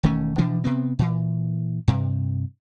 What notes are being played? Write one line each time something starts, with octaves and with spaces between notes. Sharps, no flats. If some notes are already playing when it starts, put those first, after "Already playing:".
E1 D#3 A3 C#4
B2 E3 F3 D4
C3 B3 C4
A#2 E3
G2 C3